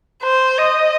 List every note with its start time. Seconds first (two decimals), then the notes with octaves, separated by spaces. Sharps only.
0.23 C5
0.58 D#5